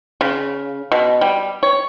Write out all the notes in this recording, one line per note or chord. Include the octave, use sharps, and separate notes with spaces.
C#3
B2
G3
C#5